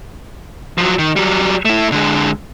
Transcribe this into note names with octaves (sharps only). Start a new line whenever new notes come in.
F3 F#3
D#3
F#3 G3
A3 E4
D3 G#3